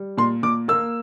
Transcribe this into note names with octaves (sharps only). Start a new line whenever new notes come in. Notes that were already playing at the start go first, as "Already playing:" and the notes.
Already playing: G3
A#2 C6
A#2 D6
A#3 E6